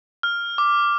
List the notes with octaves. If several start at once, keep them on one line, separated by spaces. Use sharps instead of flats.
F6
D6